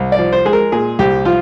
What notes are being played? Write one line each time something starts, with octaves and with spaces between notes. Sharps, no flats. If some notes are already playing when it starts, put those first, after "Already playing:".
Already playing: C2
D5
F3
C5
G#3 G#4
A#4
A#2 G#4
C2 G4
F3 F4